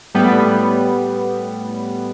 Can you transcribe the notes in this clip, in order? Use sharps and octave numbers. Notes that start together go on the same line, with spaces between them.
A2 G3 B3